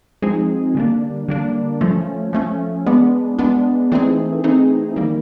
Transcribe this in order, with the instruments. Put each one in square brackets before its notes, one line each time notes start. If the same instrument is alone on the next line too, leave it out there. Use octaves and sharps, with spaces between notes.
[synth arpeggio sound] F3 G#3 C4 D#4 G#4
D3 G3 A#3 D4
D3 G3 A#3 D4
F3 A3 C#4
F3 A3 C#4
G#3 B3 D4
G#3 B3 D4
E3 A3 C4 D#4 G#4
E3 A3 C4 D#4 G#4
D#3 G3 A#3